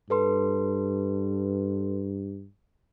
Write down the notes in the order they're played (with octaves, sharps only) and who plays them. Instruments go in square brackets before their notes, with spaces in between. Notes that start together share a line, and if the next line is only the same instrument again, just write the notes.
[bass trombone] G2 [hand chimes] A4 B4 C6